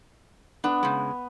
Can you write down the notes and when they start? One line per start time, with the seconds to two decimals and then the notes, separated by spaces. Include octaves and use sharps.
0.64 B3 D4
0.83 C#3 G#3